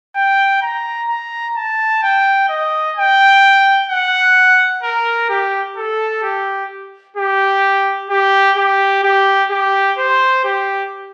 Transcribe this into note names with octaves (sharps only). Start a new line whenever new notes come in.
G5
A#5
A#5
A5
G5
D#5
G5
F#5
A#4
G4
A4
G4
G4
G4
G4
G4
G4
C5
G4